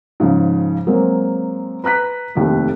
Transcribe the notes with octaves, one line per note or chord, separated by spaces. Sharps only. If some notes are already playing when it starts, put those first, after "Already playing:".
G#2 C#3 F3
F#3 G#3 A#3 C4
B4 A#5 F#6 B6
F1 D#2 A3